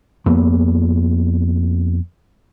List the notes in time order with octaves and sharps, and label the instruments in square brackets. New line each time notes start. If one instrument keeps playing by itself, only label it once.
[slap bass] F2 A#3 B3